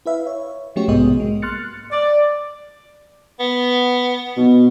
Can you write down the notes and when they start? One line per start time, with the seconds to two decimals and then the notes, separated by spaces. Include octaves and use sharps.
0.06 E4 B4 E5 F5
0.27 C#5
0.76 F3 A3 C#4 F#4 G4 C#5
0.88 B1 G#2 C3 B3 G#4 D#5
1.20 G#3 A#3
1.42 C6 F6 F#6 A6 C#7
1.92 D5
3.40 B3
4.37 B2